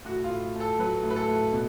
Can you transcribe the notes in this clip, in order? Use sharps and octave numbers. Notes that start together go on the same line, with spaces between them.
A2 F#4
F4
A2
A3 A4
F#3 B4
A2
B4
A4
A2
B2